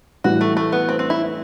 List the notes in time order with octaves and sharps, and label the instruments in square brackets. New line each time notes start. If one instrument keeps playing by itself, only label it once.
[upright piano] A2 E3 G3 [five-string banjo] F#4
[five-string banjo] A3
A3
B3
C4
C4
E4